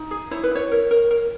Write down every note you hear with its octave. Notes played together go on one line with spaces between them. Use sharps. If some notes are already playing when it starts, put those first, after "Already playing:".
Already playing: D#4
G#4
E4 C#5
B4
E4 C#5
A#4
A#4
A#4